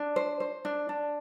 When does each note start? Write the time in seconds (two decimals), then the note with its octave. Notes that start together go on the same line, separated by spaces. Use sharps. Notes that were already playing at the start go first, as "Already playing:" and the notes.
Already playing: D4
0.16 C5
0.40 C5
0.65 D4
0.89 D4